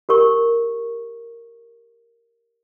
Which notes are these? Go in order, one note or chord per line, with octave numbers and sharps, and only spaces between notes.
G4 A#4 C#6